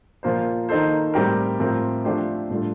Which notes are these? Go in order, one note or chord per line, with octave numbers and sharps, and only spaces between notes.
A#2 F3 A#3 F4 C5
D#3 A#3 D#4 A4 C5
A2 G3 C4 G4 A#4
A2 F3 C4 G4 A#4
F3 A3 D4 G4 C5
A2 G3 D4 F4 A4